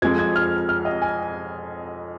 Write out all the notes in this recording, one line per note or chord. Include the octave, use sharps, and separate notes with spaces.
F2 F3 G#3 G#6
G#6
F6
F6
D#5
G#5